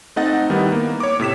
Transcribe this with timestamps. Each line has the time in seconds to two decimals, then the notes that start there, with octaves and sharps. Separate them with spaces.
0.16 A3 C4 D#4 D#5 F#5 A6
0.50 D#3 G3 B3 E4
0.72 A#3
1.00 C#5 D6
1.19 A2 C3 B6 E7